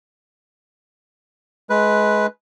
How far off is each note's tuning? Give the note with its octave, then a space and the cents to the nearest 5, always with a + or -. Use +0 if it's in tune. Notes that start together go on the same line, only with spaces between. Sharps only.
G#3 +25 B4 +0